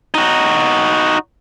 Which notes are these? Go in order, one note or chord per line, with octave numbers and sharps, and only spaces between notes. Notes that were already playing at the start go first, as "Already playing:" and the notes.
D#4 F#4